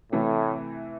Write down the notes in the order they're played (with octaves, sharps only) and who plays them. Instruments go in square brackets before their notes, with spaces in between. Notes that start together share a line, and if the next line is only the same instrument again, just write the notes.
[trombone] A2 [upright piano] C3 E3 A3